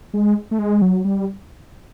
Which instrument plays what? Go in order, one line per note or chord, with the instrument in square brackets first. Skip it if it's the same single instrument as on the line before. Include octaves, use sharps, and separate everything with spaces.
[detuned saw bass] G#3
A3
G#3
F#3
G3